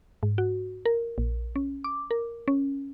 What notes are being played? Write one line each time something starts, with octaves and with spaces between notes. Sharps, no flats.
G#2
F#4
A#4
A#1
C#4
D6
A#4
C#4